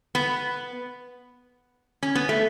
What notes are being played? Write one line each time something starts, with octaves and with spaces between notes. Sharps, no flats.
B3
C#4
B3
A3